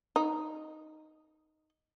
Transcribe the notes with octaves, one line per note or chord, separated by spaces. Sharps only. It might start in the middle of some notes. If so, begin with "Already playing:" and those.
D#4